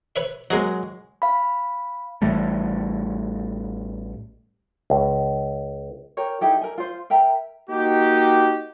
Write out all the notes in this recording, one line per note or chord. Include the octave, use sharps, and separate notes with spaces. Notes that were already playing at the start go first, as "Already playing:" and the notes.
B4 C#5 E5
F#3 G#3 A#3 G#4 D#5
F5 B5
A1 E3 G3 A3
C#2
G4 A#4 C#5
D#4 E4 G4 A4
A#4 G#5
F4 C5
A#4 E5 G5 A#5
A#3 D#4 F#4 G4